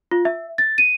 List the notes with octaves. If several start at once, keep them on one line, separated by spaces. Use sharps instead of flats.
F4
E5
A6
D#7